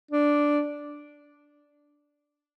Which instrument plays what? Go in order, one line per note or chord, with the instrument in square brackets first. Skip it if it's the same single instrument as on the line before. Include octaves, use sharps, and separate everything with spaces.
[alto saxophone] D4